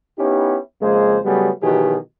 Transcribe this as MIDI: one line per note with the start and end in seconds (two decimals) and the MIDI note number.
0.19 0.57 59
0.19 0.57 61
0.19 0.57 63
0.19 0.57 64
0.19 0.57 67
0.81 1.18 41
0.81 1.18 49
0.81 1.18 56
0.81 1.18 58
0.81 1.18 68
0.81 1.18 72
1.24 1.50 49
1.24 1.50 54
1.24 1.50 55
1.24 1.50 57
1.24 1.50 59
1.24 1.50 68
1.62 1.96 47
1.62 1.96 51
1.62 1.96 52
1.62 1.96 54
1.62 1.96 67
1.62 1.96 68